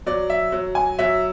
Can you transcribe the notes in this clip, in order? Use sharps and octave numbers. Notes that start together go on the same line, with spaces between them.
F#3 D5
E5
F#3
G#5
F#3 E5